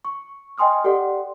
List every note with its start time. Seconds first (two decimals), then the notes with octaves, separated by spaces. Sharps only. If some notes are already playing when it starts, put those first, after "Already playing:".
0.05 C#6
0.58 D#5 G5 G#5 C6 D#6 F6
0.84 G4 A4 D5 F#5 G5 C6